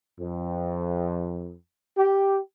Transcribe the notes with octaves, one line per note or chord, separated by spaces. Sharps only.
F2
G4